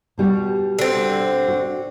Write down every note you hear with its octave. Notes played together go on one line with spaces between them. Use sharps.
B2 G3 F#4
D3 C4
F#4